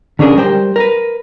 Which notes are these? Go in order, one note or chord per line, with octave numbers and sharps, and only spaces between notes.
D3 C#4 D4 G#4 A#4
G3 A#4 C5 G5
A#4 B4